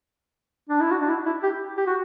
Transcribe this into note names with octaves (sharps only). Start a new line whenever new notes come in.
D4
E4
F#4
D4
E4
E4
G4
G4
F#4